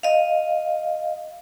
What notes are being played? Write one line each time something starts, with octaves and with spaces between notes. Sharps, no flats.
D#5 F5